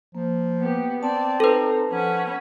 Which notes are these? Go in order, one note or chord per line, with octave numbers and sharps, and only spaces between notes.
F3 A#3
B3 G4
C4 D5 A5
D#4 A4 B4 C5
F3 C#4 F#5 B5